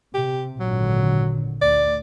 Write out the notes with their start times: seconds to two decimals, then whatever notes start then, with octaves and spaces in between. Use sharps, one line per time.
0.14 C3 G4
0.60 G#1 A#2 D3 F#3
1.61 D2 D5